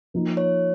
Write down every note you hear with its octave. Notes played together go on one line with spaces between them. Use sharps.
F3 A#3 D#4
C#5